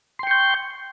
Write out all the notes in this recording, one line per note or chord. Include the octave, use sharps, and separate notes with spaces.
G5 C6 C#6 G6